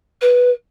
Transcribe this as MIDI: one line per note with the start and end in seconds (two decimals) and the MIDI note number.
0.21 0.50 71